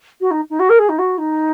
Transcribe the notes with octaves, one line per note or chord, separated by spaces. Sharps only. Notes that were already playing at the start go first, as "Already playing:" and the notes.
F#4
D#4
D#4
F#4
A#4
G#4
D#4
F#4
D#4